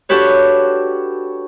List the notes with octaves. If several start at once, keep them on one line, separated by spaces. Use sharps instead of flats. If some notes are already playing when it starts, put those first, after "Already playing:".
D4 F#4 G4 A4 B4 C#5